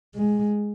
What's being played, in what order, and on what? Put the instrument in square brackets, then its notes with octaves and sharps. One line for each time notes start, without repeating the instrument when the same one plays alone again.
[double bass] G#3